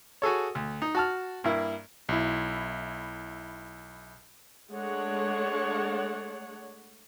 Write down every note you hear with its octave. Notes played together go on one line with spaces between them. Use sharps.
F#4 G#4 A4 C#5
D2
D#4
F#4 A5 F6
G2 A#3 E4
B1 E4
G#3 A3 D4 C#5 F#5